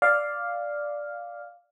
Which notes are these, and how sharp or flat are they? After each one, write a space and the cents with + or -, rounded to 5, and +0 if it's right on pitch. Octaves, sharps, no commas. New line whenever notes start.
D5 +0 F5 +0